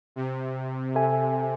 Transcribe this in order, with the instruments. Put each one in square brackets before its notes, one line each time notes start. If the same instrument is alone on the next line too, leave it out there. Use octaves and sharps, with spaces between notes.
[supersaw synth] C3
[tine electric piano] A4 E5 G#5